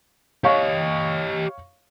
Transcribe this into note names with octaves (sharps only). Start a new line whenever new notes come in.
G4 C#5 D#5 F5 C#6